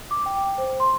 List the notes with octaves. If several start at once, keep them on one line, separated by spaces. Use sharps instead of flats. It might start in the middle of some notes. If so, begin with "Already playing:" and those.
D6
G5
C5
C6